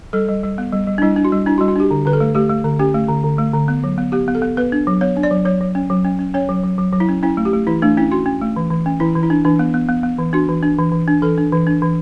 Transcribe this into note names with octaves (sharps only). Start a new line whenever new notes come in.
G3 A4
G3
G3
B3
G3
G3
D4
G3 E4
D4
F#4
G3
D4 E4
F#4
G3
F#4
D4 G4
D3
D3 B4
A4
A3
A3 G4
A3
D3
C#4 G4
A3
D3
D3
A3
D3
B3
F#3
B3
B3 G4
B3
A4
B3
B3 B4
D4
F#3
B3 C#5
D4
D5
F#3
F#3 C#5
F#3
C#4
F#3
C#4
C#4
C#4 C#5
F#3
F#3
F#3
F#3
E4
C#4
C#4 E4
A3
G4
A3
E3 E4
A3 D4
C#4 E4
C#4 F#4
C#4
A3
E3
E3
C#4
E3 E4
E3
E4
D4
E3 D4
B3
B3
B3
B3
E3
D4 F#4
E3
D4
E3
E3
D4
E3 A4
D4
E3
D4
E3